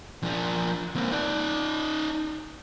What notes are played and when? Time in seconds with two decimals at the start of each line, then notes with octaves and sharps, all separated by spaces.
0.23 F3 D4
0.96 A#3 C4
1.12 D#4 D5